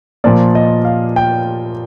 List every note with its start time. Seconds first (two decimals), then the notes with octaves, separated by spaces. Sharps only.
0.24 A#2 F3 A#3 D5
0.55 D#5
0.85 F5
1.16 G5